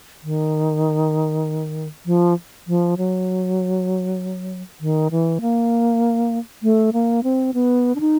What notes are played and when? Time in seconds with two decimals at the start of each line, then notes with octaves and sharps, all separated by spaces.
0.23 D#3
2.06 F3
2.67 F3
2.97 F#3
4.81 D#3
5.11 E3
5.41 A#3
6.63 A3
6.93 A#3
7.23 C4
7.54 B3
7.96 D4
8.00 D#4